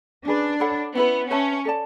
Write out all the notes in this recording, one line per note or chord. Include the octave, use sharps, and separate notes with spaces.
C#4 D4 G#4 B4
A4 C#5 F#5 B5
B3 C#4 E4 B4
C#4 B4 E5 A5
A4 D5 A5